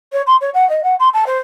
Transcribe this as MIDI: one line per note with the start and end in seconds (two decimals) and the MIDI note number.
0.13 0.22 73
0.27 0.36 84
0.41 0.50 73
0.54 0.68 78
0.69 0.81 75
0.83 0.95 78
1.00 1.09 84
1.13 1.24 81
1.26 1.38 72